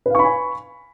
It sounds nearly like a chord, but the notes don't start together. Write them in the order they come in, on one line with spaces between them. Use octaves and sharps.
B4 F5 C#6 B5 G#5